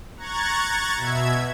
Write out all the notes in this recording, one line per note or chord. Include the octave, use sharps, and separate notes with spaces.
A#5 C#6 F#6 G#6 A6
B2 E5 G#6